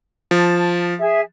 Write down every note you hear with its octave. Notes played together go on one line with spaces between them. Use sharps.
F3 A5
G#4 E5